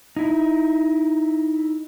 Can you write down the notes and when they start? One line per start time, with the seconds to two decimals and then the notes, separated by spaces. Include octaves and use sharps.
0.17 D#4 E4